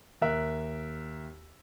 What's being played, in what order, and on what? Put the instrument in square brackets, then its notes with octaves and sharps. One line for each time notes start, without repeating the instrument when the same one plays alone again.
[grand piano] D#2 A#4 E5 F#6